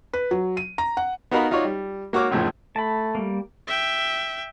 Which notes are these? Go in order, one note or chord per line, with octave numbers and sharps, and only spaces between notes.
B4
F#3
D#7
A#5
F#5
B3 D#4 F#4 A#4 F5 B5
D#4 F4 F#4 C#5 D5
G3
A#3 F#4 C#5 D6 F6
A#1 F2 A2 C#3 F3
A3 A5 B5
G3 A#3
E5 G5